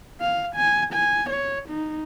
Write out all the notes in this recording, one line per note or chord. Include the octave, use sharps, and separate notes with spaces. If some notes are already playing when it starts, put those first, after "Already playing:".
F5
G#5
G#5
C#5
D#4